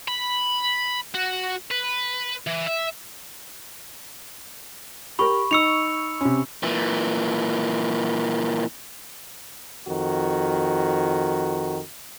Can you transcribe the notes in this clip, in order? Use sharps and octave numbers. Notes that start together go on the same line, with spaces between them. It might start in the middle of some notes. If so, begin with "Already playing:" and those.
B5
F#4
B4
E3
E5
G4 A#4 B5 C#6
D#4 C#6 E6 C#7 F7
C3 C#4
A#2 E3
F2 D#3 F#4